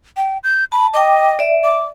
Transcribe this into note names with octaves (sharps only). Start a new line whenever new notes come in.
G5
G6
A5 B5
D#5 G5 D6
D5 E5
D6